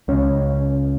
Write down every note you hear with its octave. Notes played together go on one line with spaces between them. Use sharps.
C#2 C#3 C#4